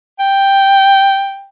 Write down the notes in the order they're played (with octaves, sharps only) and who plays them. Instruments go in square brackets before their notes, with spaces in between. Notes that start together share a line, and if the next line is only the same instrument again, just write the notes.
[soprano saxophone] G5